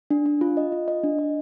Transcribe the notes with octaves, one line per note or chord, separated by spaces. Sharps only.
D4
D4
F4
D#5
F4
D#5
D4
D#5